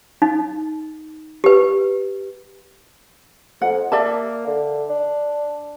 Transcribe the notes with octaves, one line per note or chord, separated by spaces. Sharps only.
D#4
G4 B4
F2 F#5
A#3 D5 E5 A5
D3
D4